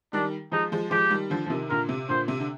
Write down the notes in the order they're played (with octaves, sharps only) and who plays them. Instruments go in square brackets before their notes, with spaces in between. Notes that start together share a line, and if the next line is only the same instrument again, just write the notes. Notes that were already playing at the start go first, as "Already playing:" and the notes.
[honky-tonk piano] D#3 G3 [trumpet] D4
[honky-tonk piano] F3 G#3 [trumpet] D#4
[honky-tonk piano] F3 G#3
[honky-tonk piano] F3 G#3 [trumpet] G4
[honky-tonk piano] D#3 G3
D3 F3
F3
C3 D#3
[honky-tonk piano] A#2 D3 [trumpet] A#4
[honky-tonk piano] C3
[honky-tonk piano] A#2 D3 [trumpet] C5
[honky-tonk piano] C3
D3